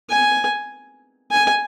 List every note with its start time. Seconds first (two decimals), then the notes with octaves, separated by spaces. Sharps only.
0.10 G#5
1.31 G#5